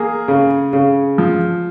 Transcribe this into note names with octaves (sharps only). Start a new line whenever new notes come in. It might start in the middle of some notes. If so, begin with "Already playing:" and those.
Already playing: A#3 G#4
C#3
C#3
F3